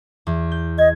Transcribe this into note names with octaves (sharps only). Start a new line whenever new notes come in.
E2
G6
D#5 G#6